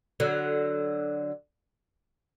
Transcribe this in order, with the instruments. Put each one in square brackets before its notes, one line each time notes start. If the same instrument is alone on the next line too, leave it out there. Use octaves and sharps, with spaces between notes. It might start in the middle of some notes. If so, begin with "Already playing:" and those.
[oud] D3 F#3